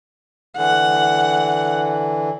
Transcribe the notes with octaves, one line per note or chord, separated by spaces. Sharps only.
D3 E3 F#5